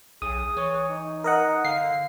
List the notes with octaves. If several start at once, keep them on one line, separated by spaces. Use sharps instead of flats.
B1 G#4 D#6
E3 C#5
D#4
A#4 D#5 F#5
D3 F5 C7